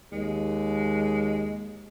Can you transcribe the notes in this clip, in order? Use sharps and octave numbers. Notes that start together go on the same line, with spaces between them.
D#2 G#3